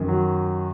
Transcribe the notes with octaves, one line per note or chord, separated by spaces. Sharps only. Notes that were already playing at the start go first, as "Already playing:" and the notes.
Already playing: F#2 D#3
F#3